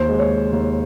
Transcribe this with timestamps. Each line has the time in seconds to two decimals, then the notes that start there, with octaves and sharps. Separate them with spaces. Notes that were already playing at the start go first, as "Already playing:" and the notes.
Already playing: D#2 C5
0.09 G#3
0.19 C#5
0.31 G#3
0.52 D#2